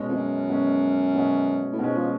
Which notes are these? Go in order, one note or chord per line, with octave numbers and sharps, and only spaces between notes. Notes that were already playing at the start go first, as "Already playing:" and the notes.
Already playing: B2 G#3 C#4
F2
F#2
B2 G#3 C#4
B2 G#3 C#4
A2
G#2 B2 G#3 C#4
F3